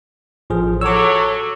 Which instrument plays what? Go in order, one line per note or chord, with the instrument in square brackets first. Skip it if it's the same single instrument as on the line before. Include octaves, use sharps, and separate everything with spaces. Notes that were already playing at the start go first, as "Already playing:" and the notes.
[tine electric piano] A1 F3 G#4
[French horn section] F#3 A4 C#5 [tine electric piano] D6 E6